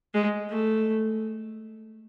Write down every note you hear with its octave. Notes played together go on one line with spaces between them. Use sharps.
G#3
A3